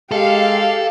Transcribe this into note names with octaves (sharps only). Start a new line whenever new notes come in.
G#3 G4 A4 F5